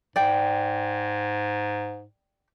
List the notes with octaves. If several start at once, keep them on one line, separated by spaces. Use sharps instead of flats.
G#2 D5 G5